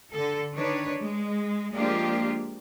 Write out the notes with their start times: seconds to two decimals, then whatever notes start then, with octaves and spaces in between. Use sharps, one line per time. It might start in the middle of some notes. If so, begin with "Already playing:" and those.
0.12 D3 A4
0.54 D#3 D4 B4 C#5
0.99 G#3
1.73 F3 G#3 A#3 D4 F4 G4